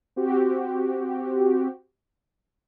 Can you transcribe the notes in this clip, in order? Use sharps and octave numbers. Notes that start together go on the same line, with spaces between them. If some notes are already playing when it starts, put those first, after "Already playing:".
C4 F#4 G4